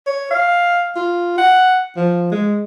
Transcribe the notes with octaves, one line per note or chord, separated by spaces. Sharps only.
C#5
F5
F4
F#5
F3
G#3